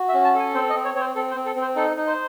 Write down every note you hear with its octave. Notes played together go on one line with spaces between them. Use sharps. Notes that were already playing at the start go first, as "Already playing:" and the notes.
Already playing: F#4
E5
C#4
A5
A4 G#5
C4 C5
D#5
C4
C#5
C4 C#5
C5
C4 A4
C5
C4
A4
C4
C5
D#4 A4
D#4
C5